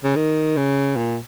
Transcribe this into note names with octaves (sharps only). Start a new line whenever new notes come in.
C#3
D#3
C#3
A#2